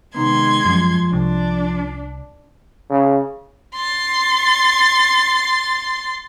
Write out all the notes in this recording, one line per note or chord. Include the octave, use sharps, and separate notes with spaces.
C3 D#3 G#3 B3 C6 G#6
F#2 F3
C2 D4
C#3
C6 A6